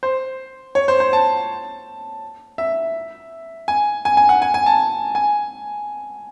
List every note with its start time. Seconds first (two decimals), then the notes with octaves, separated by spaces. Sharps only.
0.03 C5
0.75 C#5
0.88 C5
1.00 C5
1.13 A5
2.58 E5
3.68 G#5
4.05 G#5
4.17 G#5
4.29 F#5
4.42 G#5
4.54 G#5
4.66 A5
5.15 G#5